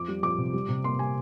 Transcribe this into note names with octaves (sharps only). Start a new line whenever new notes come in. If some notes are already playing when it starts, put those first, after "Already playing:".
Already playing: F2 F3 D6
G3
F2 D6
C3
G3
C3
A#3 C6
C3 G#5